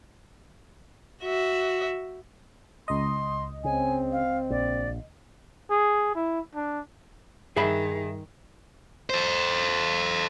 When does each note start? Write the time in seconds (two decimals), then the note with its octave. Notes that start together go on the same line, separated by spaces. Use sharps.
1.23 F#4 E5
2.88 C#2 D#5 C6
3.64 C#3 C4 G#5
4.12 F5
4.50 A#1 D5
5.70 G#4
6.15 E4
6.55 D4
7.56 G2 D#3 G3 G#4 E5 B5
9.10 A4 C5